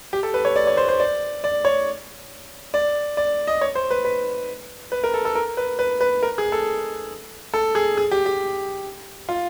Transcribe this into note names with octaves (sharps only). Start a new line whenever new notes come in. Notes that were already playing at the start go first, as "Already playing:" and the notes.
G4
A4
B4
C#5
D5
C#5
C5
C5
D5
D5
C#5
D5
D5
D#5
C#5
C5
B4
B4
B4
A#4
A4
A4
A#4
B4
B4
B4
A#4
G#4
A4
A4
G#4
G#4
G4
G4
F4